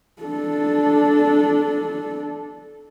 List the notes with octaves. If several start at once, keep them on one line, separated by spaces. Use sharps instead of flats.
D4 A4